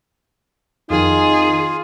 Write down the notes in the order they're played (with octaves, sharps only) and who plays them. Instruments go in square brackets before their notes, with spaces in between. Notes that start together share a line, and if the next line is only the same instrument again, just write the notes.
[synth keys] F2 D#3 [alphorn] D#4 [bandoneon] F4 [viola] G#4